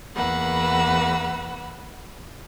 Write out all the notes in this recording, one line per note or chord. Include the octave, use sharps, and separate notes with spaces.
E2 A#3 B4 F#5 E6